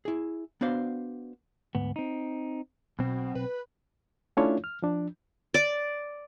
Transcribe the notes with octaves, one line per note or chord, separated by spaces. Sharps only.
E4 G#4
B3 D4 F#4 C5 F5
D2 G#2 B3
C4 D#4
B1 B2 C4
B4
A3 C#4 D4 E4 F4 C#5
F6
F3 D4
D5